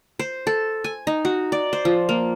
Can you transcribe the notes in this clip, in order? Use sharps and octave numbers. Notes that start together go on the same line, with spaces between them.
C5
A4
G#5
D#4
F#4
D5
C5
F3
A#3